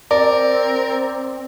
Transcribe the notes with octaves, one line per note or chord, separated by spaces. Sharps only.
C4 A#4 D5